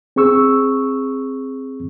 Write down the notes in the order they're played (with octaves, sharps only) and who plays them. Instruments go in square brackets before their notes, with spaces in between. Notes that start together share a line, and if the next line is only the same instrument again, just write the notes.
[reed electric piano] C4 G#4 C#6 E6